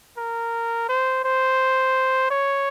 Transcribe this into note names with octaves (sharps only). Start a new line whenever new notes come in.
A#4
C5
C5
C#5